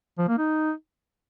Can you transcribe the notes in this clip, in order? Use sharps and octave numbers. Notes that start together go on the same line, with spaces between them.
F3
A#3
D#4